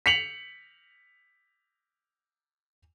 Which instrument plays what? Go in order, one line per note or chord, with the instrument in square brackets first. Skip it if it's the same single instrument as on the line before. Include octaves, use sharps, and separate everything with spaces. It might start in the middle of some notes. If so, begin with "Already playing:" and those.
[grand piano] B6 C#7 F7 F#7